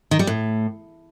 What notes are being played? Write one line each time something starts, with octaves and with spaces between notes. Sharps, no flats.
D#3
G3
A2